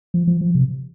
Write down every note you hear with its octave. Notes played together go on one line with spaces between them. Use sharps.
F3
F3
F3
C3